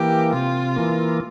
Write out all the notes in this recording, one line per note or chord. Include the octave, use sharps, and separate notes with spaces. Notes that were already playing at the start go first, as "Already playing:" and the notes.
Already playing: E3 A#3 G4
C3 F4
E3 A#3